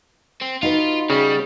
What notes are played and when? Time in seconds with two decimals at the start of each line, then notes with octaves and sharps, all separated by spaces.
0.42 C4
0.63 D#4 F4 F#4 B4
1.10 C#3 G3